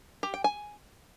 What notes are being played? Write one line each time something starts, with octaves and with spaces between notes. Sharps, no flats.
G4
G5
G#5